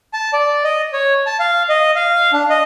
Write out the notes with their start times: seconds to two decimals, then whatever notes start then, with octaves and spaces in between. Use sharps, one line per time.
0.14 A5
0.33 D5
0.64 D#5
0.93 C#5
1.26 A5
1.40 F5
1.69 D#5
1.95 F5
2.33 D4
2.50 D#5